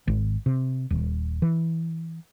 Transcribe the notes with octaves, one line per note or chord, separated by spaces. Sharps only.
G#1
C3
D#1
E3